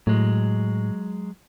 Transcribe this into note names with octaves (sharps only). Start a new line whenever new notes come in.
A2 F#3 G#3